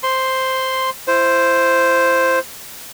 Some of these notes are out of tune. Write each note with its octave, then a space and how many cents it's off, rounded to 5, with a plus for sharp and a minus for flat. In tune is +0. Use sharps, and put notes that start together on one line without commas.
C5 +0 C6 +0
E4 +30 C5 +0